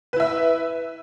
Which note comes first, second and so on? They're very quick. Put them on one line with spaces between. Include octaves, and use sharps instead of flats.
B4 E4 E5